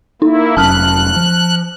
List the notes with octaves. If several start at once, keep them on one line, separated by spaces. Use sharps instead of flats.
A#3 D#4 E4
F1 F#3 C#4 A5 F6 F#6
F3